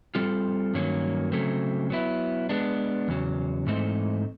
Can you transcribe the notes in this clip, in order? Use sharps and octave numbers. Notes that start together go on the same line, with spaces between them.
G3 C4 F4 A4
G2 D#3 F#3 A#3 C#4
C#3 F#3 A3 C4
F#3 B3 E4
G#3 B3 D4
E2 C#3 F#3
G#2 E3 A3 C4 D#4